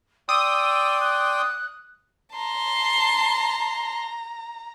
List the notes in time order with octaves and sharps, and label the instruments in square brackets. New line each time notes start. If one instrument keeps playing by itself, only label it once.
[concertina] D5 G5 C6 [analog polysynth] D#6 [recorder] E6
[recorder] F#6
[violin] A5 C6 [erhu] A#5